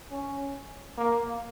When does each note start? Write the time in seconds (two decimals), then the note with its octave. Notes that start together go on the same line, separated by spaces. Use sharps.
0.11 C#4
0.98 A#3